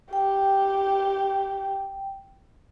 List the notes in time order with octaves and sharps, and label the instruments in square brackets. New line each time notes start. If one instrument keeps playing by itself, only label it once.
[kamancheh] G4 [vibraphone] G5